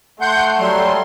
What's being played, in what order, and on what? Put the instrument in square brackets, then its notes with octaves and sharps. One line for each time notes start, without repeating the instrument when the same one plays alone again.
[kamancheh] A3 [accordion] F#5 C6 G6
[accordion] F#3 G3 C6